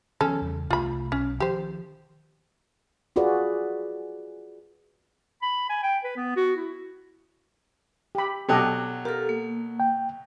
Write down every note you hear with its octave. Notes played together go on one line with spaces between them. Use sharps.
D#3 F3 B3 C#4 A4
E2 C#3 G3
C2 E3 A3 F4 B5
B1 C#4
D#3 F3 G4 C5
F4 F#4 G#4 B4 D5
B5
G#5
G5
B4
B3
F#4
E4
G4 B5
B2 F#3 G4 A4 D#5
G4 A4 A#4
A#3
G5